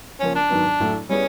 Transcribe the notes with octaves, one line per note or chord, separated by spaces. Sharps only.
C#3 F3 A#3 C#4
D4
G#2 D#3 F#3 B3
A2 F#3 A3
G3 B3 C#4 E4 G#4